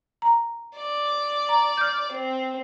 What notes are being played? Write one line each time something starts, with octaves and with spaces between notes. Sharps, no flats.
A#5
D5
A#5
F6 G6
C4